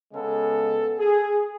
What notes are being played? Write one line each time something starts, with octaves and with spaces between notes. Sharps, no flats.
C#3 G#3 B3 A4
G#4